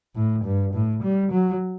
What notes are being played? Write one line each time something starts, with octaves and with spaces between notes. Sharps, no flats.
A2
G2
A2
G3
F#3